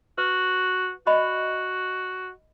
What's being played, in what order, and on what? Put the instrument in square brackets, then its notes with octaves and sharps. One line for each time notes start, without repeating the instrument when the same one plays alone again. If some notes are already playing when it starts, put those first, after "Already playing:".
[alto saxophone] F#4 [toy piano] B4
[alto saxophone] F#4 [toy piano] D5 D#5 B5